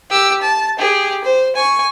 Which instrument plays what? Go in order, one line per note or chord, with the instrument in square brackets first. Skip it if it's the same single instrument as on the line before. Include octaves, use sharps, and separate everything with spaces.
[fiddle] G4 E6
A5
G4 G#4
C5
G#5 C#6